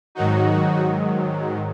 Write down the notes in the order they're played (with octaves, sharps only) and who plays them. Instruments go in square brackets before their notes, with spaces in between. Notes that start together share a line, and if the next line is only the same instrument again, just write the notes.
[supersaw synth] G#2 D#3 F#3 D#4 F#4